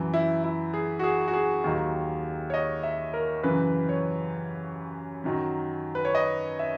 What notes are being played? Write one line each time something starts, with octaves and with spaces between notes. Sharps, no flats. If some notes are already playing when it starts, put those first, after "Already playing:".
Already playing: F#2 E3
E4
E4
G#4
F#4
G#4
F#4
G#4
D#2 D#3 F#3
C#5
D#5
E5
A#4
F#2 C#3 E3 B4
C#5
F#2 D#3 F#3
B4
C#5
D#5
E5